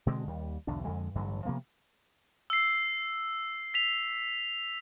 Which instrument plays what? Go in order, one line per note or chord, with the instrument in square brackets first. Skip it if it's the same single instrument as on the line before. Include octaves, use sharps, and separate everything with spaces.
[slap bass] B2 D3 G#3 C4
D#2 G3
B1 E2 D3 D4
F2 D3 G#3
A1 G2 D3 F#3
C3 F3 A#3 B3
[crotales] E6 C7
B6 F7